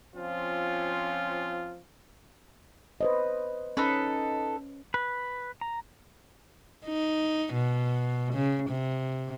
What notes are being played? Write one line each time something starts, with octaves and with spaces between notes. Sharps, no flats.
F3 C4 C#4 F4
B4 C5 D#5
C#4 D#4 A4 B4
B4
A#5
D#4
B2
C#3
C3